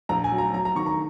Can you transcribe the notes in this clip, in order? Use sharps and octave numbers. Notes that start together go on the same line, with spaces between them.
A#1 A#5
G#5
F#3
A#5
F#3 A#5
A#5
D#3 C#6
A#5